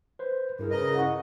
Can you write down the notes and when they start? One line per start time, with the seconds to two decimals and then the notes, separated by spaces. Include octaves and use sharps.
0.19 B4 C5
0.59 G2 E4 G#4 A#4
0.71 C#3 B4 D#5 A#5
0.95 E4 F#5 C#6